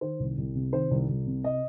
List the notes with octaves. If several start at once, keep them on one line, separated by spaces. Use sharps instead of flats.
D#3 C5
C2
C2
C3
D#3 C5
C2
C2
C3
D#5